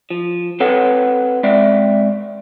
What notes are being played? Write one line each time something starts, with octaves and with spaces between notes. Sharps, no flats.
F3
C4 A4 B4 C#5 F#5
G#3 C4 D5 E5